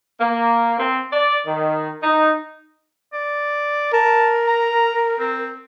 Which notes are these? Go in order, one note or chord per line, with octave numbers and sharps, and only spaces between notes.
A#3
C4
D5
D#3
D#4
D5
A#4 A5
A#5
C4